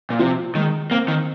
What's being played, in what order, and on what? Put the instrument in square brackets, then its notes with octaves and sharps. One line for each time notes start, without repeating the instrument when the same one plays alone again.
[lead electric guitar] A#2
[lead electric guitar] C3 [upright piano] F3
[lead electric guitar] D#3 [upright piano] G#3
[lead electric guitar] A#3 [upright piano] C4
[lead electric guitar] D#3